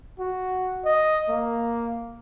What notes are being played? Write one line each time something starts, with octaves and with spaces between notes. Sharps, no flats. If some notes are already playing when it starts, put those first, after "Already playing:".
F#4
D#5
A#3